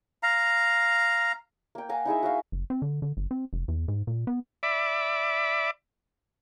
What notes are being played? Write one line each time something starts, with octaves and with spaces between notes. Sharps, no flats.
F5 A#5
A#3 G5
F5 F#5 G#5 A#5
D#4 E4 G#4 E5
F#4 E5 F5
F#1
C4
D3
D3
G1
C4
F1
E2
G#2
A#2
B3
D5 E5 B5 D6